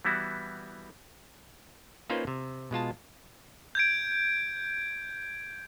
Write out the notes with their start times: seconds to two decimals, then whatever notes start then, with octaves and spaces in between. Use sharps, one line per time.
0.05 E3 G3 B3 E4 F#4
2.10 A#3 C#4 D#4 F4 B4 C5
2.27 C3
2.71 B2 G#3 F4 A5
3.75 G6 G#6 D7